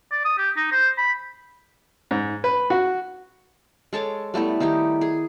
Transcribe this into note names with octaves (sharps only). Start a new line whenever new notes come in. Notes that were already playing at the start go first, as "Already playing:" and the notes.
D5
D#6
G4
D#4
C5
B5
G#2
B4
F#4
G#3 A4 C#5 D6
G3 A3 B3 E4
D#3 D#4 E4 G4
G#4